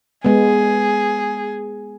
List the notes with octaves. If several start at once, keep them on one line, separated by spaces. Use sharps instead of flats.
G#3 B3 G#4